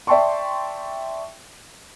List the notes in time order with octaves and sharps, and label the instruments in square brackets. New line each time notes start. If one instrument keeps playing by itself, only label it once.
[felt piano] D5 E5 G5 A5 C6 C#6